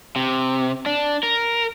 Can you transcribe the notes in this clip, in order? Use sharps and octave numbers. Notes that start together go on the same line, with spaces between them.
C3
D4
A#4